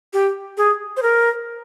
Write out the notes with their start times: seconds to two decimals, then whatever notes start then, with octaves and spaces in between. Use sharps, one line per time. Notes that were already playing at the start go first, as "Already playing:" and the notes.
0.13 G4
0.57 G#4
0.97 C5
1.02 A#4